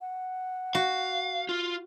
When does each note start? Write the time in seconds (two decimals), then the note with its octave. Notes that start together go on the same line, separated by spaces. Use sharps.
0.01 F#5
0.75 F#4 F5
1.49 F4